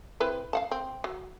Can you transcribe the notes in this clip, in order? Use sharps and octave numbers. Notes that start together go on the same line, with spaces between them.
C4 E4 B4
F5 F#5 A5
C4
F#3